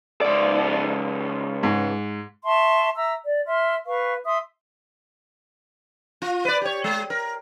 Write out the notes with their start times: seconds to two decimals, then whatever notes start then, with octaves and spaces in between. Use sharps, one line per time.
0.21 C#2 D5
1.63 G#2
2.45 E5 A5 C6 C#6
2.96 E5 A#5 E6
3.24 D5
3.47 E5 C6 F6
3.85 B4 F5 C#6
4.24 E5 C6 D#6
6.22 F4
6.45 B4 D5
6.61 G4 C#5
6.84 G#3
7.10 A#4